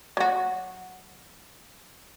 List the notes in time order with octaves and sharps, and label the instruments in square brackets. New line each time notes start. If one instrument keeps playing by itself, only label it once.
[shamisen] F#3 F#4